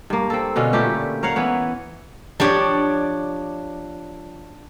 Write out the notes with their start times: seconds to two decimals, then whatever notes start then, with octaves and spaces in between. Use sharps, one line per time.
0.10 G2 A#3
0.30 C4 A4
0.56 B2 D3 C#4 F4
0.73 A#2 A3 G4 B4
1.23 A#4 C#5 F5 F#5
1.36 E3 B3 C#5
2.40 F3 D4 G4 C#5 D5